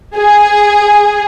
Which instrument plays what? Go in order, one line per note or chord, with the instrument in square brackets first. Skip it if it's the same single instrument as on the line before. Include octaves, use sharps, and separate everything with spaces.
[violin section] G#4